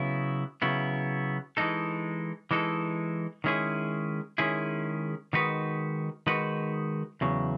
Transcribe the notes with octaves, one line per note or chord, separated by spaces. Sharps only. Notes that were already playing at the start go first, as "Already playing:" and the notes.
Already playing: C#3 F#3 B3 E4
C#3 F#3 B3 E4
E3 G#3 D#4 A4
E3 G#3 D#4 A4
D#3 G#3 C#4 E4 G#4
D#3 G#3 C#4 E4 G#4
D#3 G#3 D#4 F#4 B4
D#3 G#3 D#4 F#4 B4
E2 C#3 F#3